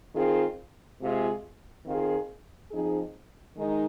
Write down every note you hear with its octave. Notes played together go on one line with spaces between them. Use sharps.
D#3 C4 F4 G#4
C3 G#3 F4 G#4
D#3 C4 F4 G#4
F3 C4 D#4 G#4
D#3 G#3 D#4